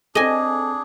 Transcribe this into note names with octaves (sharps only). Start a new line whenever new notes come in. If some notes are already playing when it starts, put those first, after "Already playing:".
C4 D4 G#4 A4 D#5 G#5